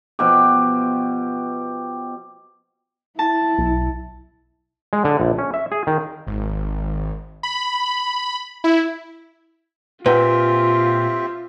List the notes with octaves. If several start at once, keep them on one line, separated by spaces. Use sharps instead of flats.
B2 F3 G4
E4 A5
B1
G#3
D3
A#1
C#4
E5
G#4
D#3
G#1
B5
E4
A#2 C4 F4 G4 B4 E5 F#5